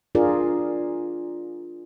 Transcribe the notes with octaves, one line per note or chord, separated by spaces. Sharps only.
D4 F4 G#4 A#4 D5